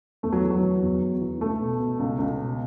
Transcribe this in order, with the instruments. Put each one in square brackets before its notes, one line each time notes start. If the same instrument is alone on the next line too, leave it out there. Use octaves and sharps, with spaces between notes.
[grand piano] E2 A3
F#3
E3
F#3
E3
E2
E2
E3
C#2 A3
B2
B2
C#2
C#2
B2